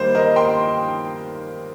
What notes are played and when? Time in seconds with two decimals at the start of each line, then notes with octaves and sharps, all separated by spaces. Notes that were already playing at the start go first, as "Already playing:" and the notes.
Already playing: D#2 D#3 G3 A#3 C5
0.15 A#4 D#5
0.36 G5 C6